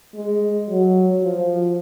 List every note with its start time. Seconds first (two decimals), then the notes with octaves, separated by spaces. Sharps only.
0.14 G#3
0.69 F#3
1.22 F3